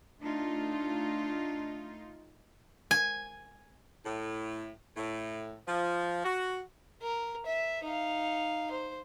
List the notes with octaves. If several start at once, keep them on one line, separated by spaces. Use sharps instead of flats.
A3 D4 D#4 F4
G#5
A2
A2
F3
F#4
A#4
E5
D#4 F5
C5